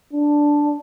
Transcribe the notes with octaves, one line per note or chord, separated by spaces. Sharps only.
D4